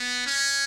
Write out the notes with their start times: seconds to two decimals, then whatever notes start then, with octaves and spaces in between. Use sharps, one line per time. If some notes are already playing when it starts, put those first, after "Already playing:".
Already playing: B3
0.26 C#4